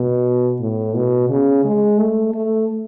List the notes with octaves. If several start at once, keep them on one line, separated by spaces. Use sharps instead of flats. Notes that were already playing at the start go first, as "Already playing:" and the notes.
Already playing: B2
A2
B2
C#3
G#3
A3
A3